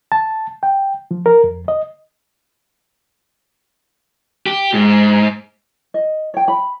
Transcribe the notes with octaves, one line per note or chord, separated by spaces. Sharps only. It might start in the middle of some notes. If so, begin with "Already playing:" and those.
A5
G5
F3
A#4
F2
D#5
G4
G#2
D#5
C#5 G5
B5